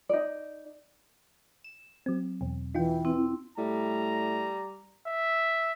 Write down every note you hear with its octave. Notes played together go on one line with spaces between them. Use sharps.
D#4 D5
E7
F#3 C4
E2 B2
E3 D#4 F4 G5
C4 E4
A2 G3 A#5
E5